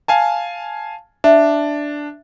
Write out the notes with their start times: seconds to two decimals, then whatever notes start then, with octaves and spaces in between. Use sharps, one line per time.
0.08 F5 G#5 A5
1.24 D4 E5